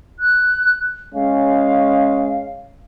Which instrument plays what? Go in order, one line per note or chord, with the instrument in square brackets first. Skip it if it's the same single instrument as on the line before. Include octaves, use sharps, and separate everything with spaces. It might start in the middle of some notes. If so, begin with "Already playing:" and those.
[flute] F#6
[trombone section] G#3 C#4 [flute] F5